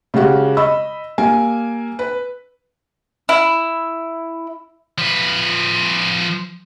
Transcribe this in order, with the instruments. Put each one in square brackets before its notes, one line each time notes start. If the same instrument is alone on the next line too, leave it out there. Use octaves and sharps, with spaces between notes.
[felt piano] C#3 G3 G#3 F#4 G4
D#5 B5 E6
G3 A#3 G#5
B4
[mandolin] E4
[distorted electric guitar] F3 B4